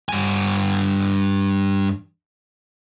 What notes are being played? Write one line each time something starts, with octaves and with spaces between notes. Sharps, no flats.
G2 G#5